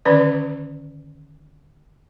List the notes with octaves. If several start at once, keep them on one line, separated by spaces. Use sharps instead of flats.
D3 D#3 C#4 B4 D5